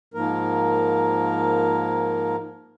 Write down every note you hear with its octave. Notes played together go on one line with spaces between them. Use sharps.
G#2 F3 A#3 A#4